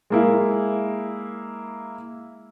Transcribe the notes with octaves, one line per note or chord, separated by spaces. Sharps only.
G#3 A#3 E4